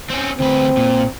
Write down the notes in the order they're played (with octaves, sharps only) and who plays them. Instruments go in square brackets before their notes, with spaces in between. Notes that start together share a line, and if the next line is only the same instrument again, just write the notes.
[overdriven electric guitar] C4 C#4
[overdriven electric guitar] D2 B4 [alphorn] C4
[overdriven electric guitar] A#2